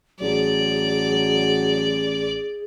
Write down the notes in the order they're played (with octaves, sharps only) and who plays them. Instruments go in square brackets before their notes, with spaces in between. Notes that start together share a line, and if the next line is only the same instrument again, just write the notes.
[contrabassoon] A1 [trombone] F#3 [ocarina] G#4 [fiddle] D5